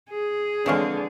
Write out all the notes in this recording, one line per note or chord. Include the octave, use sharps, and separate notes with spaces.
G#4
D3 E3 F3 G#3 C4 C#5 F5